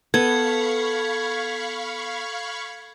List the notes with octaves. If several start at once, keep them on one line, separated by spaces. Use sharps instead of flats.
B3 A4 F5 B5 C#6 G#6